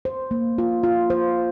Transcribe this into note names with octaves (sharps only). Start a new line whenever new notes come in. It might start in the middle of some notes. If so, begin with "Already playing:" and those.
C5
A#3
F4
F4
C5